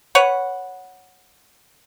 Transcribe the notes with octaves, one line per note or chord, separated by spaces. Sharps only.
B4 C#5 F#5